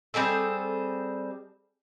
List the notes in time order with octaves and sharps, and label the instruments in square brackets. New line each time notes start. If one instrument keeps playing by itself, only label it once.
[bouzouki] G3 C4 G#4 A4